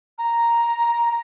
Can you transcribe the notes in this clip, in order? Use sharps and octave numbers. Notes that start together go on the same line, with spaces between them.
A#5